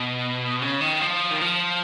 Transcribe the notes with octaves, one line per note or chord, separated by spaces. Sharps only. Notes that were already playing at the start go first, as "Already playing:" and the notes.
Already playing: B2
C#3
D#3
F3
D#3
F3